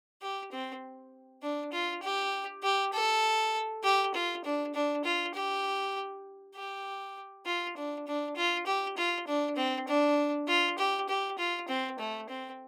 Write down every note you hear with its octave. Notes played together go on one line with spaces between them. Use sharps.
G4
C4
D4
F4
G4
G4
A4
G4
F4
D4
D4
F4
G4
G4
F4
D4
D4
F4
G4
F4
D4
C4
D4
F4
G4
G4
F4
C4
A3
C4